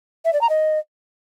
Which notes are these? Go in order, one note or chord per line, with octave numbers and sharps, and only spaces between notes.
E5
D5
A#5
D#5